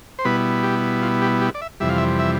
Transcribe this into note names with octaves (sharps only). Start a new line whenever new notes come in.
C5
B2 G3 B3 E4 B4
G4
F4
G4
G4
D5
E5
F2 C3 E3 G3 E5
F5
E5
E5